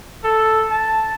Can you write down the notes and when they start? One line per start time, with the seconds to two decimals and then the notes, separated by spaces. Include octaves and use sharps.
0.24 A4
0.71 A5